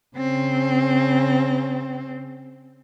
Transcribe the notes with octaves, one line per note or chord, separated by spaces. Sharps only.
C#3 C4